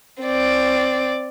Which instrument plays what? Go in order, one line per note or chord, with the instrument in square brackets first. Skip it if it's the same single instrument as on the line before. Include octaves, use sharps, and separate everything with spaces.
[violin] C4 D5